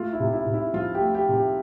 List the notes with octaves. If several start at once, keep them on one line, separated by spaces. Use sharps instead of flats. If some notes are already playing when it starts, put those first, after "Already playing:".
Already playing: A3 F4
E4
C3
E4
C3
E4
F3 F4
G4
A3
G4
C3
G4